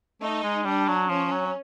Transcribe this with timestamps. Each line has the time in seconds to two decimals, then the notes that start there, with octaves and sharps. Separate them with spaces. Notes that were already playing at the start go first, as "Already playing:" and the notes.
0.22 A3 D#4
0.43 G#3
0.65 G3 D4
0.88 F#3
1.08 F3 C#4
1.31 F#3